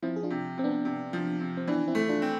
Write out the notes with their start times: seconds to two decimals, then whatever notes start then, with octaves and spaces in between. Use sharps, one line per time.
0.02 F3 C4 E4
0.16 G#4
0.23 D4 F4
0.30 C3
0.58 C3 C4
0.64 B3 D4
0.85 C3
1.13 F3
1.40 C3
1.57 C4
1.68 E3 B3 D4
1.88 C4 E4
1.95 A3
2.09 D4 F4
2.22 C4